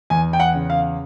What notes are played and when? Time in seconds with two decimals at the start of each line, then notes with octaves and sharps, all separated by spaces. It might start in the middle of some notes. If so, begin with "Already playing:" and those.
0.10 E2 G#5
0.33 G5
0.40 F#5
0.54 C#3
0.70 F5